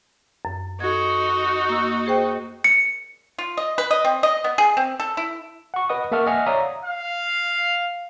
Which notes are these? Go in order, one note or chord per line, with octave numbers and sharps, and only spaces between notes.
F#2
D#4 F#4 A4 G#6
A#3 E6
G#4 C5 G5
C#7
F4
D#5
B4
D#5
C4
D#5
B3
G#4
C4
A4
E4
F#5 C#6
B4 D#5 F#5 D#6
A#3 E5 F#5 A5 C#6 F6
D#5 E5 F#5 G#5 F6
C#5 D5 E5 F5 A#5 D#6
F5